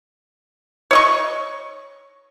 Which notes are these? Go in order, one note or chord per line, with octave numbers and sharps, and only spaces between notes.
C#5 D#5 C#6